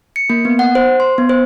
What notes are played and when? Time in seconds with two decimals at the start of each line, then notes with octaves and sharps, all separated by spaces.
0.16 C#7
0.30 A#3
0.45 B3
0.59 F#5
0.75 C5
1.00 C6
1.18 B3
1.29 C5